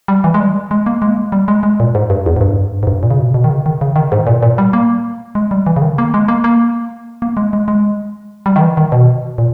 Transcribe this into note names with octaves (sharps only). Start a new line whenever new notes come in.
G3
E3
G#3
G3
G#3
A#3
G#3
A#3
G#3
G3
G#3
G#3
A#2
G#2
G2
E2
G#2
G2
G#2
G2
A#2
C#3
B2
B2
D#3
C#3
D#3
C#3
D#3
G#2
A#2
A#2
G3
A#3
G#3
G3
E3
C#3
D#3
A#3
G#3
A#3
A#3
A#3
G#3
G#3
G#3
G3
D#3
E3
D#3
B2
A#2